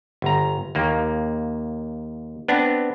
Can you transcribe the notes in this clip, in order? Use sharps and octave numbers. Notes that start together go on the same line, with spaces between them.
G1 A#5
D#2 A#3
B3 C4 D4